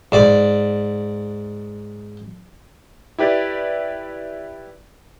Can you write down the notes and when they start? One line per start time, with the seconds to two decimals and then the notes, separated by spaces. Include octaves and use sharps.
0.12 G#2 D5 D6
3.18 E4 G4 B4 D5